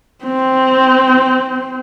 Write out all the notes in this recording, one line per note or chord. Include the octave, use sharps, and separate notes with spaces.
C4